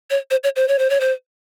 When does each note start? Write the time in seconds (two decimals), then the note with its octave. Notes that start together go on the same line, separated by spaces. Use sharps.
0.10 C#5
0.31 C5
0.44 C#5
0.56 C5
0.68 C#5
0.79 C5
0.90 C#5
1.00 C5